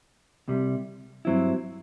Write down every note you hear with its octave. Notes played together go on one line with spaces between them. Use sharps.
C2 C3 G3
G2 F#3 C4 E4